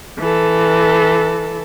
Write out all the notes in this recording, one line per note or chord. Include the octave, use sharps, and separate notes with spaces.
E3 A4